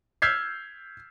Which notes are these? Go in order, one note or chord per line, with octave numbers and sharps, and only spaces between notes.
E6 F6 G6 G#6 B6 C7